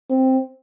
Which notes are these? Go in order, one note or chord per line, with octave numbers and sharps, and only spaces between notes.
C4